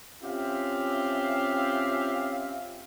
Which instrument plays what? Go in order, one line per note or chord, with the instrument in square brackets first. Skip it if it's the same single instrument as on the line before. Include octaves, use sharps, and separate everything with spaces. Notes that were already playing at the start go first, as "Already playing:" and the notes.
[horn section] C4 C#4 F4 G4 E5 F5